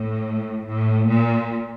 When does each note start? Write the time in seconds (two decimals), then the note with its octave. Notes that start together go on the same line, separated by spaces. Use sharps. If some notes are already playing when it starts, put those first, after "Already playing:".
Already playing: A2
0.66 A2
1.08 A#2